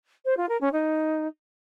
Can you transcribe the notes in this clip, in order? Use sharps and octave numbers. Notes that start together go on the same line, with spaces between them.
C5
F4
A#4
C#4
D#4